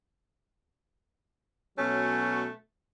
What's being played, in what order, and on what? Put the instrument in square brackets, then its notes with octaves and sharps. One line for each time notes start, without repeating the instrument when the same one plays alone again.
[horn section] B2 F#3 C#4 [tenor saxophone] A3